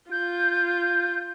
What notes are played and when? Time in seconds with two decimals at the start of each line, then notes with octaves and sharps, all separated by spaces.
0.11 F4 G6